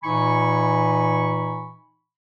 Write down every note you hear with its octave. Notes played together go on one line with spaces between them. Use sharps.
A#2 E3 D#4 G#5 B5 C#6